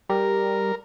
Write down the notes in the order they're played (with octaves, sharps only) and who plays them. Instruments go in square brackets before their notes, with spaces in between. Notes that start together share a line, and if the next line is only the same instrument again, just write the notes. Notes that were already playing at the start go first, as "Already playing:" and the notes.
[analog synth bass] G3 [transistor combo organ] A#4